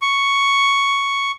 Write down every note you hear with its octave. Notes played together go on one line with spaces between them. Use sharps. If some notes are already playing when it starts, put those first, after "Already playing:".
C#6